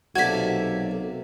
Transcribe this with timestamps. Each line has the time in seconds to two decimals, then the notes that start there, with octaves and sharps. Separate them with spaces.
0.16 B1 C3 A#3 F#4 A4 D5 G#6 B6